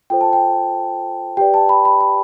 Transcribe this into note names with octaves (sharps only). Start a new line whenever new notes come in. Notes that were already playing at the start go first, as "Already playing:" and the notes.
F4 A4 C5 G5
A5
G5
G4 B4 D5 G5
A5
B5
B5
B5